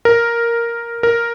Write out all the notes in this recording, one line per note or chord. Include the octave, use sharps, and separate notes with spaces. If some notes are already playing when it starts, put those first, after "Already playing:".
A#4
A#4